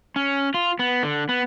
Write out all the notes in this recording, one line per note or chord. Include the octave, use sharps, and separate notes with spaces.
C#4
F4
B3
D3
B3